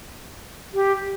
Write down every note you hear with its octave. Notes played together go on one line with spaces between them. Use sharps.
G4